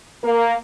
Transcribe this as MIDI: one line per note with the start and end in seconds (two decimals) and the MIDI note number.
0.23 0.54 58